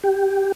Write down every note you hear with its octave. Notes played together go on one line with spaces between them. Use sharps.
G4